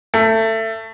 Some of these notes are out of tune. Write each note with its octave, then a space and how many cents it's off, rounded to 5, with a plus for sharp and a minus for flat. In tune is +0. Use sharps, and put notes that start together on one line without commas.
A3 +20